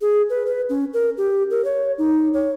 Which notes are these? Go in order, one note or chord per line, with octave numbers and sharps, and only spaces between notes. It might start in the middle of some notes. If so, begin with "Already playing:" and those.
G#4
B4
B4
C#4
A#4
G4
A#4
C#5
D#4
C#5